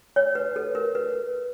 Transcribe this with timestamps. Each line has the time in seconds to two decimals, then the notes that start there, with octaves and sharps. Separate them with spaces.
0.16 C#5
0.35 B4
0.56 A4
0.75 A#4
0.95 B4